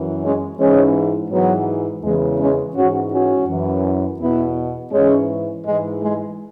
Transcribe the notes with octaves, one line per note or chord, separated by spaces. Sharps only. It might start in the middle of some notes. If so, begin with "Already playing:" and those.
Already playing: F#2 E3
G#3 C#4
G#2 E3 G#3 C#4
G#2 E3 F#3 B3
E2 C#3 E3 G#3
G#3 C#4
G#2 E3 C#4 F#4
C#4 F#4
F#2 E3
E2 B2 B3 E4
G#2 E3 G#3 C#4
G#2 E3 G#3
G#3